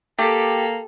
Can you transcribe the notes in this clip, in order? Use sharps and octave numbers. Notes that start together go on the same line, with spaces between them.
A#3 G4 A4